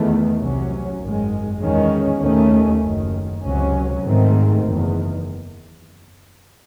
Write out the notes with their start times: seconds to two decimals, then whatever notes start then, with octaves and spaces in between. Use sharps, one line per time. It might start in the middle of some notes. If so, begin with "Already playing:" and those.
Already playing: E2 D#3 A3
0.41 C2 C3 F#3 C#4
1.01 G#1 F#2 D#3 G#3
1.62 E2 D#3 G#3 C#4
2.22 D#2 D#3 A3 C#4
2.83 F#1 F#2 D#3
3.44 C#2 C3 F#3 C#4
4.05 G#2 D#3 A3 C4
4.65 F#1 E2 D#3